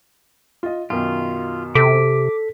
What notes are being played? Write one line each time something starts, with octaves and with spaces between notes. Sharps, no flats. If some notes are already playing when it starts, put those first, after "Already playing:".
F4 D#5
F#2 B2 D#3 F4
C3 A4 D6 B6